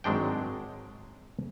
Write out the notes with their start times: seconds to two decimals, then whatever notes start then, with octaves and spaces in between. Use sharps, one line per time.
0.04 G#1 F#3 G#3 D4 G5